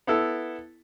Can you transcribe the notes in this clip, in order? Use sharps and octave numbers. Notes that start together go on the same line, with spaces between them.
B3 E4 A4